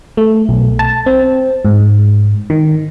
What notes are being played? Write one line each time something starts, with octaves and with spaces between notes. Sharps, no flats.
A3
B1
A5
C4
G#2
D#3